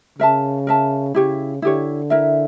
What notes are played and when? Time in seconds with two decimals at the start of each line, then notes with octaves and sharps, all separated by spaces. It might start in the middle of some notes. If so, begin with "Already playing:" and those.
0.19 C#3 A#4 E5 A5
0.67 A#4 E5 A5
1.14 C#3 E4 G4 C#5
1.62 D3 E4 G4 C#5
2.10 E4 A#4 E5